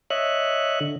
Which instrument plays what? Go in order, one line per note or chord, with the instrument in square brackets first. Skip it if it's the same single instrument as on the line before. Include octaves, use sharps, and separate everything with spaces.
[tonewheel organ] C#5 D#5 E5 F#6
D3